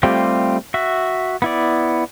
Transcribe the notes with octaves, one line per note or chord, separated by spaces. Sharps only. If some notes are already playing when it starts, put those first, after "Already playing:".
G3 A3 C4 F4 G4
F#4 E5
B3 E4 D5